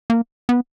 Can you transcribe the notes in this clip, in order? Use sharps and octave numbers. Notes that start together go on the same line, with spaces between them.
A#3
B3